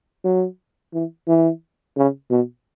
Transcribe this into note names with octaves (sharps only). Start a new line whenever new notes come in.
F#3
E3
E3
C#3
B2